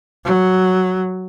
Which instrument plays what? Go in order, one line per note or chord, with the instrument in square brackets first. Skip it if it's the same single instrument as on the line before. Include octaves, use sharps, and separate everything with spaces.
[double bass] F#3